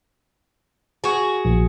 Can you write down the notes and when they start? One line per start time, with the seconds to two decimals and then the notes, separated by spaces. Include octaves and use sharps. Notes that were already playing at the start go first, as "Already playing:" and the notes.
1.04 F#4 G#4
1.45 A#1